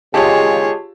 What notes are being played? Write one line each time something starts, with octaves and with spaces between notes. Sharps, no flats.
C#3 G#3 F4 G4 G#4 C#5 A5